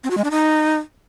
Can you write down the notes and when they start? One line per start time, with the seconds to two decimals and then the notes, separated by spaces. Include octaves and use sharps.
0.04 C4
0.11 F#4
0.17 G#3
0.24 D4
0.31 D#4